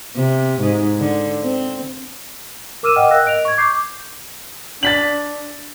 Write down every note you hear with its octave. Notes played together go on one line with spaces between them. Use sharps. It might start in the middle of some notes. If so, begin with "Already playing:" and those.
C3
G#2
D3
C4
A#4 D6 E6 F6 D#7 E7
D#5 F#5 G5 D#6 F6
A#4 F5 G5 E6 F#6 A#6
D#5 D7 F7
C#6 G#6
D6 G6 C7
D4 A6 B6 F#7